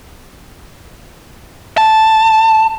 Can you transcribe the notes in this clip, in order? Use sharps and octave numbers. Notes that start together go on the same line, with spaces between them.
A5